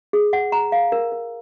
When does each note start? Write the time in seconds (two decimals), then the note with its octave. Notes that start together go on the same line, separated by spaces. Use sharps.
0.13 G#4
0.33 F#5
0.52 A#5
0.72 F5
0.92 A#4
1.12 A#4